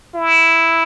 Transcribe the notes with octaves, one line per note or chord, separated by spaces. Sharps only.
E4